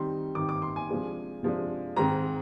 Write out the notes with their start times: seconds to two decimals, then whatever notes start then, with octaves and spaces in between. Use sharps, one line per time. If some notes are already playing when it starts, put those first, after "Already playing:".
Already playing: D#3 G3 C4 D#4 C6
0.35 D#3 G3 C4 D#4 D6
0.49 D6
0.62 C6
0.76 G#5
0.89 C3 F3 G#3 D4
1.43 C3 F3 G#3 D4
1.96 G#2 D#3 G#3 C4 A#5